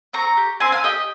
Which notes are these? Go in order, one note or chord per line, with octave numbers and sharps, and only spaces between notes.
C4 A#5 C#6
G4
C4 G#5 C6
F5 G#5
G4 D#5 G5